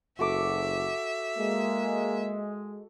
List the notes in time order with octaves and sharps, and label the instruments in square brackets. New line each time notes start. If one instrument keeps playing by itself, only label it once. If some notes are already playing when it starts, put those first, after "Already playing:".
[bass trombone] F#1 [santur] F#4 A4 D6 [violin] E5
[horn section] G#3 [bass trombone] A#3